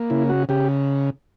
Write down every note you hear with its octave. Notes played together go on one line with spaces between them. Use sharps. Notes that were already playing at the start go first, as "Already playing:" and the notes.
Already playing: A#3
C#3 E4
F#4
C#3 G4